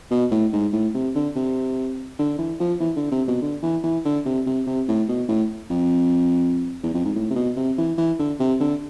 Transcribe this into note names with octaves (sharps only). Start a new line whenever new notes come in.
B2
A2
G#2
A2
C3
D3
C3
D3
E3
F3
E3
D3
C3
B2
D3
E3
E3
D3
C3
C3
C3
A2
B2
A2
F2
E2
F2
G#2
A2
C3
B2
C3
E3
E3
D3
C3
D3